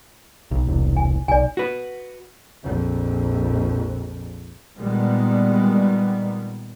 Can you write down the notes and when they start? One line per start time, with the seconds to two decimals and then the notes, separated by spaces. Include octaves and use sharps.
0.51 B1
0.67 E1 C2
0.97 G#5
1.28 B1 D5 G#5
1.57 F#4 B4
2.63 A#1 F2
4.78 A#2 D#3 G3 G#3 B3